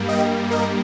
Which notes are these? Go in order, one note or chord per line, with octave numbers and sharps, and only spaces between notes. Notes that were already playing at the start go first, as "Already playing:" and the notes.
Already playing: G2 G3 A#3
D#5 G5
A#4 D#5